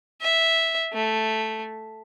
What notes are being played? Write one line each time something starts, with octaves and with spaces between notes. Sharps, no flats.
E5
A3